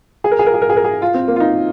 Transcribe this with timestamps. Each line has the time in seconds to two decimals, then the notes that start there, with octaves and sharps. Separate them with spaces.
0.24 G#4
0.31 A#4
0.39 G#4
0.46 A#4
0.54 G#4
0.62 A#4
0.70 G#4
0.77 A#4
0.84 G#4
1.02 F4
1.14 C4
1.28 A#3
1.36 F4
1.40 D#4